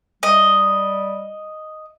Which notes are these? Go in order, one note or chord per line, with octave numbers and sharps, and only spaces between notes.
G3 D#5